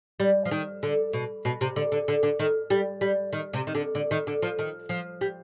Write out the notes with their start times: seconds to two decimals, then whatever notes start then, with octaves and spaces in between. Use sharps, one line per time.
0.20 G3
0.45 F3
0.51 D#3
0.83 D3
1.13 B2
1.45 B2
1.61 C3
1.76 D3
1.92 D3
2.08 D3
2.23 D3
2.39 D#3
2.70 G3
3.01 G3
3.33 D#3
3.53 C3
3.67 D#3
3.75 D3
3.95 D3
4.11 D#3
4.27 D3
4.42 F3
4.59 D#3
4.89 F3
5.21 G3